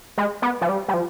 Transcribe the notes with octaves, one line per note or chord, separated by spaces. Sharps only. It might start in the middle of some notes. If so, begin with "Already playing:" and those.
G#3
B3
F3
G3
G3
F3